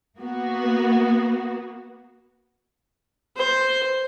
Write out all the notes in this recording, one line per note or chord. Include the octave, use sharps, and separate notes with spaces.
A#3 B3 F#4
C5